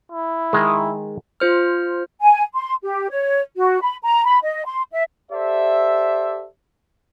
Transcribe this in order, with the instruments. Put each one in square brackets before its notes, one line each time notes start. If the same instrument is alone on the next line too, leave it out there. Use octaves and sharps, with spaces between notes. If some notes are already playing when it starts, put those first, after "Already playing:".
[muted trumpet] E4
[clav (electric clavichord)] D#3 G#3
[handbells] F4 C5 F6
[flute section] G#5
C6
G4
C#5
F#4
B5
A#5
B5
D#5
C6
E5
[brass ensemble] G4 A4 C5 D5 E5